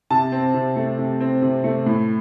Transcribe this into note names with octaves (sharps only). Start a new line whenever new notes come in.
C3 A5
C4
C3
A3
C3
C4
C3
A3
A2